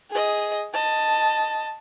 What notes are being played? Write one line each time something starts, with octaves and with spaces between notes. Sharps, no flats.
G#4 D#5
D#5 A5